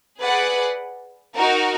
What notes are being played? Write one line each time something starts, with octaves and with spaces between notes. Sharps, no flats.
G#4 B4 D5 F#5
D#4 F#4 A#4